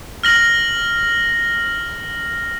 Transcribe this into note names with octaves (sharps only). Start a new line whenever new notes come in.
F6 A#6 F#7